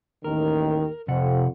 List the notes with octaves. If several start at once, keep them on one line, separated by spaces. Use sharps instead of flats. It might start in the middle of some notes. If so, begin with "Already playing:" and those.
A1 D#2 D#3 A#4
F2 C3 F#5